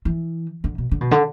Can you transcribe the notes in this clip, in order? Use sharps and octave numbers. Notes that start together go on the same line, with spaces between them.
E3
D3
B2
D3
B2
D3